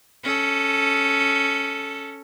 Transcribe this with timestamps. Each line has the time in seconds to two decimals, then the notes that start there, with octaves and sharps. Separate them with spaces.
0.24 C#4 A4